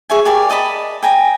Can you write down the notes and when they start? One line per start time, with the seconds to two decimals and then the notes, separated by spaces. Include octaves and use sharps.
0.10 G#4 C#5 E5 G#5
0.25 G4 G#4 A#4 D5
0.50 D5 D#5 A5 B5
1.03 G5 G#5 A#5